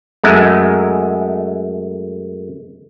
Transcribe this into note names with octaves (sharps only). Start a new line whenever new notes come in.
F#2 G#3 A3